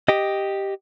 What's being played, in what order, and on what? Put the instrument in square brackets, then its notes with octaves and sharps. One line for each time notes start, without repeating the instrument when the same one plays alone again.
[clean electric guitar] G4 D#5